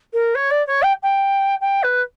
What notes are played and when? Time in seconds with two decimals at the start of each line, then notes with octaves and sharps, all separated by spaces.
0.13 A#4
0.35 C#5
0.51 D5
0.67 C#5
0.83 G5
1.03 G5
1.61 G5
1.83 B4